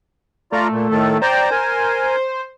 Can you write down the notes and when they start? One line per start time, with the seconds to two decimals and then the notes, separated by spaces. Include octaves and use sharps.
0.52 A3 F4 D5 A#5
0.71 A#2
0.91 A2 D#3 A4
1.22 C5 D5 G5 A#5
1.51 A#4 G#5